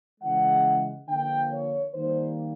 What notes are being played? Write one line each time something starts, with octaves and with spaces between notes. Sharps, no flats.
C#3 E3 G#3 F#5
D3 F3 A#3 G5
C#5
D#3 G3 A#3 C5